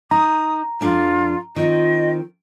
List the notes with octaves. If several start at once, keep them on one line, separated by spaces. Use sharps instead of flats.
D#4 A#5 D#6
F2 D4 F4 F5
D#3 C4 F4 D#5